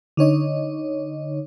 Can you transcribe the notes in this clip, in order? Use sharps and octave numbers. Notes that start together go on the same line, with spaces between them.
D3 D#4 C#5 D#5